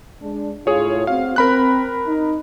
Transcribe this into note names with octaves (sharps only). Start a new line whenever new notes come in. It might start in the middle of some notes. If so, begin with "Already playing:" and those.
G#3 D4
A2 F4 G#4 C#5
C4 F#4 F5
C4 A#4 B5 F#6
D#4